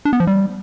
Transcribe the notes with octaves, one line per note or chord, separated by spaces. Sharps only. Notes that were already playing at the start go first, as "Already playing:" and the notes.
D4
B3
F3
G3